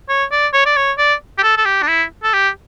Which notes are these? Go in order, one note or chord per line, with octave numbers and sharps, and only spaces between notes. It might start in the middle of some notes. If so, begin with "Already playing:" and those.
C#5
D5
C#5
D5
C#5
D5
G4
A4
A4
G4
D4
E4
A4
G4